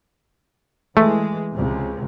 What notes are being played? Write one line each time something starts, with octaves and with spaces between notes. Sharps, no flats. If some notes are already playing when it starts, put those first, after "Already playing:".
E3 G#3 A3
C#2 C3